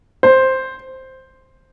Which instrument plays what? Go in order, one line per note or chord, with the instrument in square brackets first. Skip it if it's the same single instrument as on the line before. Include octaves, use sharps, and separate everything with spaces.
[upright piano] C5